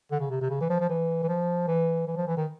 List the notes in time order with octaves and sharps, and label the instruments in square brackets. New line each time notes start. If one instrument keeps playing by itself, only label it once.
[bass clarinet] D3
C#3
C3
C3
C#3
E3
F3
F3
E3
E3
F3
E3
E3
F3
E3
D#3